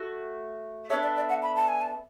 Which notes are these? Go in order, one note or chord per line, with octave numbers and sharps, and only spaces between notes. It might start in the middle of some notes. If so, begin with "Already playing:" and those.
Already playing: A3 F#4
B3 D4 A4 C#5 E5
D5
D5
F#5
B5
A5
G#5
A5